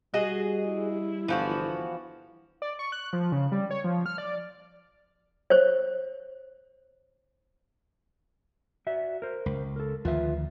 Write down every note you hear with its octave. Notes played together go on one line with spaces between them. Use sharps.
G3 F#4 G#4 D#5
E4
G1 E3 F3 F#4
D5
C#6
F#6
F3
C#3
G3
C#5
F3
F6
D5
C5 C#5
F#4 D5 E5
A#4 C5
C#2
A4 A#4
D2 D#3 F3 F4 B4 E5